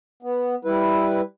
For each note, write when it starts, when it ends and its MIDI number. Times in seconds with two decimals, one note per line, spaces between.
0.23 0.55 59
0.65 1.21 55
0.65 1.21 64
0.65 1.21 71